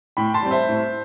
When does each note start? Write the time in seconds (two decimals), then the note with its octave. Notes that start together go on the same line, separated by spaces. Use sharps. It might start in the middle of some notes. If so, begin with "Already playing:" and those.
0.17 A2 G5 B5
0.34 A5 C6
0.42 G3 C4
0.51 C5 E5
0.69 A2